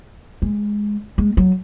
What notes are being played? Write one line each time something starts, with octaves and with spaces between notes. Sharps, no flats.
G#3
G#3
F#3